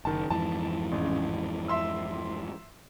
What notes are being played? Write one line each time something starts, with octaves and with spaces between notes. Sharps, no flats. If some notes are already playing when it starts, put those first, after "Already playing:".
F#1 D#3 A5
F2 G#2 E3 A5
A1 C#3
E5 C6 E6